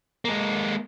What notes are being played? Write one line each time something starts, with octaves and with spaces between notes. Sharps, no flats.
G#3 A#3